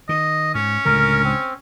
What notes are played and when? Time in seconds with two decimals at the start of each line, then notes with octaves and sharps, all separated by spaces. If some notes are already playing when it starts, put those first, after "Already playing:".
0.09 D#3 D#5
0.55 G#2 C#4
0.85 C#2 A2 D3 A#4
1.24 C4